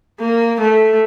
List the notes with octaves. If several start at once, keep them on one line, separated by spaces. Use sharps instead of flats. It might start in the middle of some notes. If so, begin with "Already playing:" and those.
A#3
A3